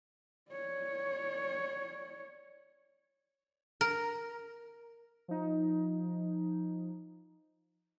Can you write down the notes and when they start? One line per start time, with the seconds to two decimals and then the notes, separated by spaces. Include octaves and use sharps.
0.51 C#5 D5
3.81 A#4
5.28 F3 D#4